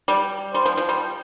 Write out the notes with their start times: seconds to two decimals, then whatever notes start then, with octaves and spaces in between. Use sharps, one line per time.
0.08 G3
0.54 G3 C5
0.65 F3
0.77 F3
0.89 G3